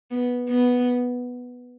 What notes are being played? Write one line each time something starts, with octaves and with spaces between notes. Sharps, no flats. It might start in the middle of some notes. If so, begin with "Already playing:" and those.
B3
B3